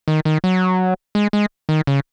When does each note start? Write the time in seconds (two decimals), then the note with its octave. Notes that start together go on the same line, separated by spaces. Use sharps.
0.08 D#3
0.25 D#3
0.44 F#3
1.15 G#3
1.33 G#3
1.69 D#3
1.87 C#3